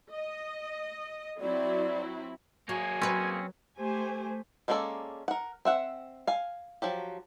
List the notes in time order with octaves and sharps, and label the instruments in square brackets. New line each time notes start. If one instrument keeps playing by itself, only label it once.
[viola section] D#5
[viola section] F#3 C4 E4 [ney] D5
[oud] F#3 [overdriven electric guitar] A#3 G#4 [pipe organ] G#5
[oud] F#3 B4 [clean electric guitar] C4 C#4
[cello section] A3 [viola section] G4 C5 G#5
[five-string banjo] G#3 A#3 C#4 A4 D5
A#4 F#5
C4 E5 F#5
F5 G#5
F3 F#3 G4